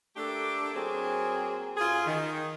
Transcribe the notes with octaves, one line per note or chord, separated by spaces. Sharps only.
A3 A#3 D4 G4 A4
F#3 A#3 C4 G#4
F#2 F4 G#4
D#3